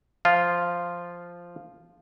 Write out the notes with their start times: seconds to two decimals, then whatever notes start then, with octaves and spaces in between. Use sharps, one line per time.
0.25 F3 F4